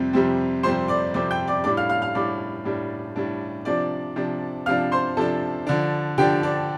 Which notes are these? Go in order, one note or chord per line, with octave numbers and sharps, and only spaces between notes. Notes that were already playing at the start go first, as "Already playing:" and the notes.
Already playing: F2 C3 G3 C4
F2 C3 G3 C4
F2 C3 G3 C4 C5 C6
D5 D6
F2 C3 G3 C4 D5 D6
G5 G6
D5 D6
A2 G3 D4 D5 D6
F5 F6
F5 F6
F5 F6
A2 G3 D4 D5 D6
A2 G3 D4
A2 G3 D4
C3 F3 D4 D5 D6
C3 F3 D4
C3 F3 D4 F5 F6
C5 C6
C3 F3 D4 A4 A5
D3 F3 D4
D3 F3 D4 G4 G5
D4 D5